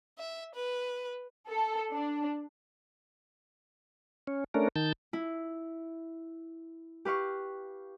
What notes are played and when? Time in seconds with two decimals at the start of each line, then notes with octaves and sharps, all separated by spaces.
0.18 E5
0.55 B4
1.50 A4
1.94 D4
4.27 C#4
4.54 A3 C#4 D4 A#4
4.76 D#3 A5 G6
5.13 E4
7.05 G4 B4 F5 C#6